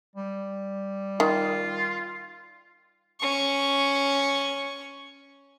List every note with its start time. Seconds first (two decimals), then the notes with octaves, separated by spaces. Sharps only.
0.15 G3
1.20 D#3 F4
3.20 C#4 C#6